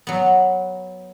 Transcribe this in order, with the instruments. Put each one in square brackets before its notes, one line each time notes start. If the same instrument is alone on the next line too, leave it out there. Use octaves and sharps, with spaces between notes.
[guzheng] F#3 B3